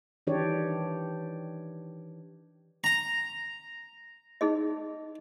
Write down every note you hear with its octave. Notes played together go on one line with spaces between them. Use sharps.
D#3 E3 D4 G4 C#5 D5
A#5
D#4 G#4 D#5